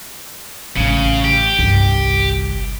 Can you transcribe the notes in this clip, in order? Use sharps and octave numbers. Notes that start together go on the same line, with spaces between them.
A1 C#3 A3
G4
G1 C2